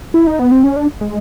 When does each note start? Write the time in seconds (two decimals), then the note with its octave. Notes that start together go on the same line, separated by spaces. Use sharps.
0.14 E4
0.27 D#4
0.39 B3
0.52 C4
0.64 C#4
0.76 D4
1.01 G#3